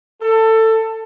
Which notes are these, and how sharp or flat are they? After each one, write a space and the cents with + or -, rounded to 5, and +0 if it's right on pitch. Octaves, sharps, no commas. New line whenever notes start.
A4 +20